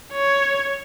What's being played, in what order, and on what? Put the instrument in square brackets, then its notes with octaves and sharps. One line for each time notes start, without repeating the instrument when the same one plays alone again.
[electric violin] C#5